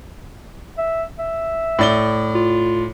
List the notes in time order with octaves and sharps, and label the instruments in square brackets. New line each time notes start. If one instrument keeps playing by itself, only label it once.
[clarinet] E5
E5
[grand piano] A2 D5 G7
[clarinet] F4